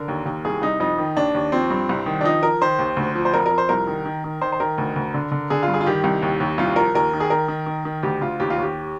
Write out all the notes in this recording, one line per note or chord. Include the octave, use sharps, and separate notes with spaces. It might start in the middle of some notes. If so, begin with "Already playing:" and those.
Already playing: D3 A#4
D#2
D#2
C2 G#4
C2 D#4
F2 D#4
D#3
D#2 D4
D#2
F3 C4
G2
C2
D#3
D4
F3 D#4
F3 A#4
D#3 C5
D#2
D2
F3
C5
F2 A#4
A#4
F2
C5
C2 A#4
D#3
D#3
D#3
D#3 C5
C5
D#3 A#4
D2
D2
D3
D3
D3 G#4
F4
G2
G#4
F4
D#3 G4
C2
D#2
D#2
C2 F4
F3 A#4
D#2 A#4
D#3
G#4
D#3 A#4
D#3
D#3
D#3
D2 G4
D2 F4
D#2 G4
F4
D#2 G4